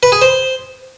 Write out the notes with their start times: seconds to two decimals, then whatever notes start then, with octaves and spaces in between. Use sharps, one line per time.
0.03 B4
0.12 G#4
0.22 C5